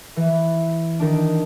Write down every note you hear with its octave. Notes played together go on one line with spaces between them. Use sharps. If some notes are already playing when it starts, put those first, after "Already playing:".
E3
D#3 D4